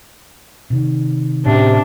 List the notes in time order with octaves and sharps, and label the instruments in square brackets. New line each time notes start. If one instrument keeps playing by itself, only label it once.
[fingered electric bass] C3 D#3
[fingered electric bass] A2 C#4 [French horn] C3 [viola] D4